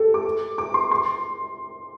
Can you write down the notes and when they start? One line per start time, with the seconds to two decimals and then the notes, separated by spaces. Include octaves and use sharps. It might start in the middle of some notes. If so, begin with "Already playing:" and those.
Already playing: G4 A4
0.14 D6
0.58 D6
0.74 C6
0.91 C6